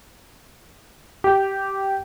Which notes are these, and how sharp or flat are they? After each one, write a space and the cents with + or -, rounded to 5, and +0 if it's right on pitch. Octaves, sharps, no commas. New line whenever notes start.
G4 -10